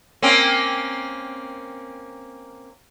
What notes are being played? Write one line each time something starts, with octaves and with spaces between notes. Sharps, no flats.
A#3 C4 C#4